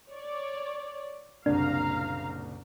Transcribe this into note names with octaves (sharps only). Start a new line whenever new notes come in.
C#5 D5
F#1 C2 A#2 D4 F5 A#5